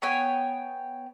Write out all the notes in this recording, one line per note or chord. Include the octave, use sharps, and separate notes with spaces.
B3 C#5 G5 G#5